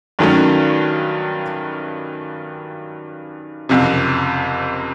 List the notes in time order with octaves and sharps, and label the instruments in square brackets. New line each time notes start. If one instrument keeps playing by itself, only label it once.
[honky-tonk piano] G2 D#3 F#3 A3 C#4
F#1 F2 C3